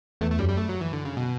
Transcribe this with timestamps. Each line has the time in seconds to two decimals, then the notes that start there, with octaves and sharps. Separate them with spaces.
0.21 E2 A3
0.31 A3
0.39 F#2 G3
0.49 G3
0.57 A3
0.69 F#3
0.81 E3
0.93 D3
1.05 C#3
1.17 B2